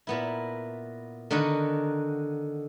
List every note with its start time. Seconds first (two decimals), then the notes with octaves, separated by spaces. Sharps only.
0.07 A#2 B3 E4
1.30 D3 D#3 D#4 F#4 F#5 B5